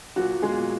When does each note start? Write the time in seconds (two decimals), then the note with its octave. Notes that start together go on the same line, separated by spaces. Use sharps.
0.16 A#2 F#3 F#4
0.33 A#2
0.42 G#3 G#4
0.51 A#2